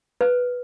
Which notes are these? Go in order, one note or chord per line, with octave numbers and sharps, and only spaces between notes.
B4